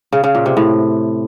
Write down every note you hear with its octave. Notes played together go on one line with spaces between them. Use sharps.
C#3
C#3
A#2
C3
A2